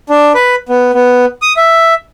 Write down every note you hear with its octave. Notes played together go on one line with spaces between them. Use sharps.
D4
B4
B3
B3
D#6
E5